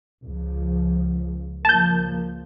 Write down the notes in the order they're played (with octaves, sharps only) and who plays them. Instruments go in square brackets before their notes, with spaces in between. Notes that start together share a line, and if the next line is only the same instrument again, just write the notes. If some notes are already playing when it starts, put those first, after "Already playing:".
[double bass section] C#2 F3
[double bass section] C#2 F3 A#3 [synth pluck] A5 G6